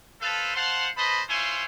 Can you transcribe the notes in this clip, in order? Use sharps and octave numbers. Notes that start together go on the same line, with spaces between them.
A4 B4 C5 F5 A5
C5 F5 F#5 A5 C6
B4 C5 D#5 A5 B5
E4 F4 C5 C#5 G#5